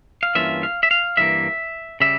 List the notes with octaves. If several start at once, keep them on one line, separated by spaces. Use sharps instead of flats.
F5
G2 E3 A#3 C#4 F4 E5
F5
E5
F5
G2 E3 A#3 E5
C#3 G3 E5